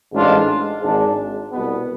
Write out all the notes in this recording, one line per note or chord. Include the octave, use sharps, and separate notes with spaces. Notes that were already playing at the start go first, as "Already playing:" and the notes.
A1 G#2 G#3 D4 F4
G#1 G#2 G#3 D4
C2 B2 B3